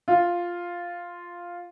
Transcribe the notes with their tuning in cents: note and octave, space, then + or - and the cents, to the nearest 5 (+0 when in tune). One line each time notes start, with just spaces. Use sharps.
F4 +0